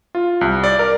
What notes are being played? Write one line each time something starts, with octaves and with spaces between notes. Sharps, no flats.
F4
C2
D5
A#4